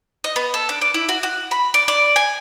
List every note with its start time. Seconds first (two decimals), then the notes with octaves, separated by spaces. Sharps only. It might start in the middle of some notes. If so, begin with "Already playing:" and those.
0.24 D#5
0.36 B3
0.54 A4
0.69 D4
0.81 D5
0.94 E4
1.09 F#4
1.23 F#4
1.51 B5
1.74 D5
1.88 D5
2.16 G#5